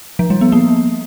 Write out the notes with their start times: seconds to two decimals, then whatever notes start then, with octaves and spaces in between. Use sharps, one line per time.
0.19 F3
0.30 G3
0.41 B3
0.52 A#3